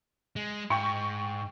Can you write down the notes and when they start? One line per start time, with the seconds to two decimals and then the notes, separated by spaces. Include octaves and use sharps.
0.36 G#3
0.70 G#2 G5 C#6